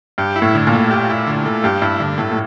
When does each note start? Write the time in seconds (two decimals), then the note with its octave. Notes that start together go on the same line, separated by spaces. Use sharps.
0.18 G2 G4
0.36 E4
0.42 A2
0.55 D3
0.67 A#2
0.73 A3
0.91 G4
1.10 E4
1.27 D3
1.45 A3
1.64 G2 G4
1.81 G2 E4
2.00 G2 D3
2.18 A2 A3
2.31 A2